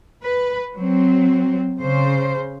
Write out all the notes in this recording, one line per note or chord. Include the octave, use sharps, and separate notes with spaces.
B4
F#3 C4
C#3 C5